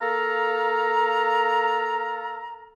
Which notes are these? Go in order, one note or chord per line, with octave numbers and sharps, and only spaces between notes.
A#3 A4 F5 A#5